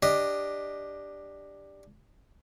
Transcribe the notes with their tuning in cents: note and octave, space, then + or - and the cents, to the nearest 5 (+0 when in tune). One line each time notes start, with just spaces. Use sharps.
D4 +0 G4 +10 D#5 +0